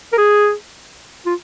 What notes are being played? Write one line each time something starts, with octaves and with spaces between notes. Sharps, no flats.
A#4
G#4
F4